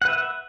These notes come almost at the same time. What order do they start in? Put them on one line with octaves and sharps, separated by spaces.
F#5 B4 E5